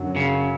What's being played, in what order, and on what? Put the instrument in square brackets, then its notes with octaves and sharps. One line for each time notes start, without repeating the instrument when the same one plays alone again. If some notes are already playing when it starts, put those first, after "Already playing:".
Already playing: [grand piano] F#2 D3 F#3
[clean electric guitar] C#3